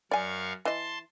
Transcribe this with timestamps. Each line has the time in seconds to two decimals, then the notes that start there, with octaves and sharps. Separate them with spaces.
0.11 F#2 D5 F5 G#5 C#6
0.65 E3 D#5 A5 C6